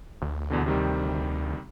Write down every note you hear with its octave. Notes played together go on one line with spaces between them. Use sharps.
D2
E2 B2 D3
C3 D#3 G3